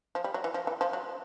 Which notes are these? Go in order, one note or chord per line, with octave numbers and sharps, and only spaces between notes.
F3
G3
F#3
E3
F3
E3
F3
F#3